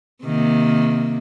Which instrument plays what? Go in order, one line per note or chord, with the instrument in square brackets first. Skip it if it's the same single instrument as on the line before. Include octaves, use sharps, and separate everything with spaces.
[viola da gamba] C3 D#3 A#3